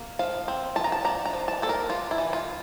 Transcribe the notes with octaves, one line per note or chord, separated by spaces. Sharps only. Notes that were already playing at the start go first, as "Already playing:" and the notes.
Already playing: A#3
F3 F5
C4
F3 A5
A#5
A5
D4 A#5
A#5
F3
A5
A#3 A4
A#4
D4 F4
E4
E3
F4